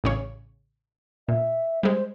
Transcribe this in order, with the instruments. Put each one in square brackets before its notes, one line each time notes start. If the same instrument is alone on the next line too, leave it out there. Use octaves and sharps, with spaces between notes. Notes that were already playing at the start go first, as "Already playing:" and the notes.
[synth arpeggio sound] A1 C#3 C#5
[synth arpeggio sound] A#2 [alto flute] E5
[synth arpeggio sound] G3 G#3 [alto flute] C5